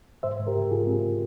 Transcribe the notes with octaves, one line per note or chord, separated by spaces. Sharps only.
G#2 C5 E5
G#2
G4 A#4
G#2
G#2 F4 G#4
C4